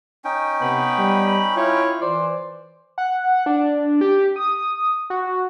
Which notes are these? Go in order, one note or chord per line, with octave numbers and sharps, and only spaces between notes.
C#4 D#4 G5
C3 B3 B5
G3
E4 F4 C#5
E3 C5 D5
F#5
D4
G4
D#6
F#4